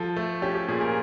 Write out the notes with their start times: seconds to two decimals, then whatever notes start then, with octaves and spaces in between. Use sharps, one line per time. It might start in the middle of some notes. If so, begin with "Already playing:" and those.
Already playing: F3 A4
0.16 A3
0.42 C#4 G4
0.55 G4
0.68 A#2 G#4
0.81 A#4